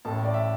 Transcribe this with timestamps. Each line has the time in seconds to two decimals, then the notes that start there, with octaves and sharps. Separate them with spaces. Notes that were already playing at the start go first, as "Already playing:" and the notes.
0.05 A1 A2 A3 A5
0.25 D5
0.34 E5